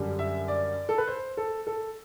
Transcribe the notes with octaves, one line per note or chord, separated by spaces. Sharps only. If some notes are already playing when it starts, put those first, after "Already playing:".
Already playing: F#2 D3 G3
E5
D5
A4
B4
C5
A4
A4